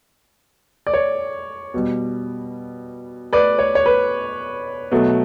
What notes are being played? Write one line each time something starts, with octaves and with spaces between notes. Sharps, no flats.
D5
C#5
B2 G3
B4 D5
C#5
C#5
B4
B2 F#3 A3